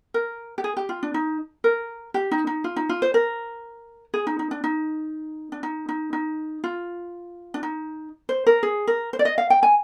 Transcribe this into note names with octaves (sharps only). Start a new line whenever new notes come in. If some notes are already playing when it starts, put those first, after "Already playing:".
A#4
G4
G#4
G4
F4
D4
D#4
A#4
G4
D#4
D#4
F4
D#4
F4
C5
A#4
G#4
D#4
D#4
D4
D#4
D4
D#4
D#4
D#4
F4
D4
D#4
C5
A#4
G#4
A#4
C5
D5
D#5
F5
G5
G#5